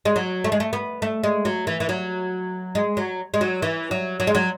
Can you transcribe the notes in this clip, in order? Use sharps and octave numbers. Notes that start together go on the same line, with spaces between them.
G#3
F#3
A3
G#3
A3
B3
A3
G#3
F#3
E3
E3
F#3
G#3
F#3
G#3
F#3
E3
F#3
F#3
G#3
F#3